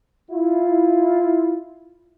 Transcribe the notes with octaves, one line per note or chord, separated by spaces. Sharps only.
E4 F4